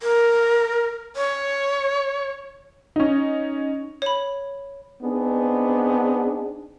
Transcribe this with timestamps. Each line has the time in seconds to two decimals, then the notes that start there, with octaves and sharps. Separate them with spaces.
0.01 A#4
1.16 C#5
2.96 C#4 D#4
4.02 C#5 B5
5.02 B3 C4 D4 D#4 G#4